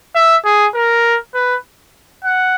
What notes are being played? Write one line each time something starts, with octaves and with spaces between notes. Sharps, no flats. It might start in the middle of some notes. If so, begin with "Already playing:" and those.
E5
G#4
A#4
B4
F#5